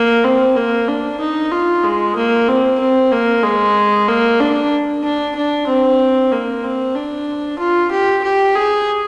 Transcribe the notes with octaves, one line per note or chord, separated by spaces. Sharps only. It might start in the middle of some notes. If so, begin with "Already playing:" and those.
Already playing: A#3
C4
A#3
D4
D#4
F4
G#3
A#3
C4
C4
A#3
G#3
A#3
D4
D4
D4
C4
A#3
C4
D4
F4
G4
G4
G#4